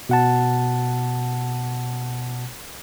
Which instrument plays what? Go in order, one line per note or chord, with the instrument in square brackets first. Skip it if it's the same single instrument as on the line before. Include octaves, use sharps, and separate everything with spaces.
[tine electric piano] B2 F#5 A5